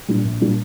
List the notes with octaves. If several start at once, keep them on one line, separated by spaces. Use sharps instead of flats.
A#2 G3 D4
A#1
A#2 G3 D4